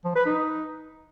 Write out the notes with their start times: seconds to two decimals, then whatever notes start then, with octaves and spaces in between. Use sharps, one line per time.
0.05 F3
0.15 B4
0.26 D#4